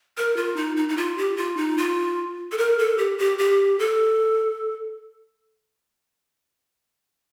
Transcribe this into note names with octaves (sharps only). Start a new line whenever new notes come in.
A#4
F4
D#4
D#4
D#4
F4
G4
F4
D#4
F4
A4
A#4
A4
G4
G4
G4
A4